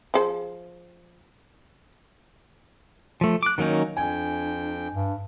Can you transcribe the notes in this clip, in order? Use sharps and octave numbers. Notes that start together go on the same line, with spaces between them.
F3 G#4 C5
F3 A3
D6 F#6
D#3 F#3 A#3 C#4 D#4
F2 D4 G5 G#5
G2